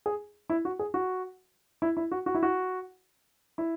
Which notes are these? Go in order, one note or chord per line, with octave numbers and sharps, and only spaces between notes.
G#4
E4
F#4
G#4
F#4
E4
E4
F#4
F#4
E4
F#4
E4